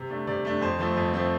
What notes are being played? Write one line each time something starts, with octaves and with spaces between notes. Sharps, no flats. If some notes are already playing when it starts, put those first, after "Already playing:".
Already playing: C3
A3 D4
C3 D5
A3 D4
F2 C5
F3 A3 C4
F2
F3 A3 C4